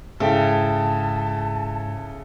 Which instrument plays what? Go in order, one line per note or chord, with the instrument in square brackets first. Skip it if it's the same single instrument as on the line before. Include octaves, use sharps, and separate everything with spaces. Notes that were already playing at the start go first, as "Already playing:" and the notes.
[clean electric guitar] G#2 E4 [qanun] C#3 [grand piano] A4 E5 G5 [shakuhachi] A5